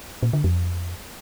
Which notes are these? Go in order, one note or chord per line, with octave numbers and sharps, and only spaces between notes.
A#2
D3
F2